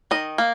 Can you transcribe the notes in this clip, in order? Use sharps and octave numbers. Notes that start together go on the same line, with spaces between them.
D#3 D#5
A#3